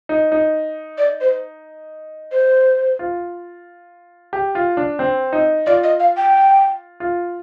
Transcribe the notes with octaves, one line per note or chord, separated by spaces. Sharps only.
D#4
D#4
D5
C5
C5
F4
G4
F4
D4
C4
D#4
F4 D5
D#5
F5
G5
F4